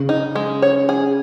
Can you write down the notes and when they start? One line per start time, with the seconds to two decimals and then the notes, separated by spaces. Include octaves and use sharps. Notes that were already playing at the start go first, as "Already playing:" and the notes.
Already playing: C#3
0.09 D#4
0.35 G#3
0.62 C#5
0.89 G#4